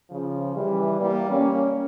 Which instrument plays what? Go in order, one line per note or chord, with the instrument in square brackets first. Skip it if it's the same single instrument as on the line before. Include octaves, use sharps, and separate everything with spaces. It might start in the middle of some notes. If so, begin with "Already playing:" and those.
[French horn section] C#3 F3
E3 G3
G3 A#3
A#3 C#4